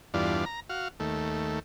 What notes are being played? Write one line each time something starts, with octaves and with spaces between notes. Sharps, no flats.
E2 G2 D4 F4
A#5
F#4 F5
D#2 A3